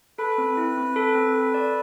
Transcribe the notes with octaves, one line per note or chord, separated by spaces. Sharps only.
A4 B4
C4
E4
C4
A4
C4
A4
D5